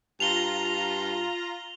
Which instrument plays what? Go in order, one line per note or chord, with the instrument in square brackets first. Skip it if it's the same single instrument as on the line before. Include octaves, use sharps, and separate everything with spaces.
[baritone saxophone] G2 [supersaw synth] F4 A#5 A#6 [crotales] F7 G7